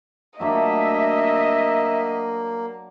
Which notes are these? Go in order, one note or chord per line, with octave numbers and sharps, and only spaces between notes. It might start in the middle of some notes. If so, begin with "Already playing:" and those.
F#3 A3 A#3 D4 D#5 E5